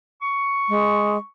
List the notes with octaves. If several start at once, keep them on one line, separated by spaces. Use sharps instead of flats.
C#6
G#3